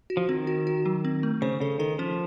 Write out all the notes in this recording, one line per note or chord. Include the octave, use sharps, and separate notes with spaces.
F#4
F3
D#3 C4
F#4
F#4
F#3
C4
A3
C#3 C5
C#3 A4
D#3 A4
F3 C#4